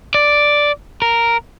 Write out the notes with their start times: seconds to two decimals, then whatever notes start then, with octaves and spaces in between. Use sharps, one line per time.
0.14 D5
1.02 A#4